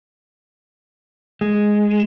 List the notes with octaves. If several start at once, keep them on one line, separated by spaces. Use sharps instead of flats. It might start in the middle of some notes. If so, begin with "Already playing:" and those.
G#3